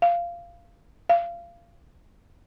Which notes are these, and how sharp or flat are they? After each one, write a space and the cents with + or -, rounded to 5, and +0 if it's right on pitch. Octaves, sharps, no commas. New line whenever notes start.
F5 -15
F5 -25